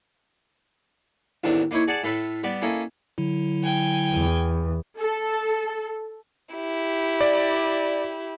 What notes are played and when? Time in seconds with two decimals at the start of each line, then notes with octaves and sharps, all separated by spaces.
1.44 A1 E2 D#3 C4 D4
1.71 A#3 D#4 E4 C#5
1.88 G#4 D5 F#5 A5
2.04 A2 A4 B4 E5
2.43 G3 B3 D5
2.62 A#3 C#4 E4 A4 D#5
3.18 D3 F#3 E4
3.63 G5 G#5
4.14 E2
4.98 A4
6.55 E4 G4
7.21 D5